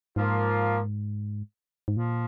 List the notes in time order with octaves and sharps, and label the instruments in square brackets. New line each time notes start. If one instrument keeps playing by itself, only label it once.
[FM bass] G#2 [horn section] F3 A#3 F4
[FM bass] G#2
[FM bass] A#2 [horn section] F3